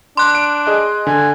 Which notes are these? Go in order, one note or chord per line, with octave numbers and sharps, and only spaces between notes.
D4 C6 F#6
D7
G#4 D#5
D3 G#5